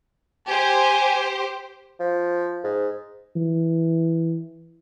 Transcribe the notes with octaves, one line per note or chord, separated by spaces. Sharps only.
G4 C5 G#5
F3
G#2
E3